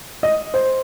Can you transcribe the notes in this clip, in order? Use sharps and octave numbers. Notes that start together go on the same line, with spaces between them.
D#5
C5